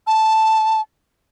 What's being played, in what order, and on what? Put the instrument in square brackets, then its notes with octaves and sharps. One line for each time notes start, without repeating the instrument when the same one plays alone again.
[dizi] A5